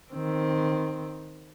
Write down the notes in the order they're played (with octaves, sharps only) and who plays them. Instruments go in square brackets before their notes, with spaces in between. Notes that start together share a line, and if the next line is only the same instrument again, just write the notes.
[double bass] D#3 C4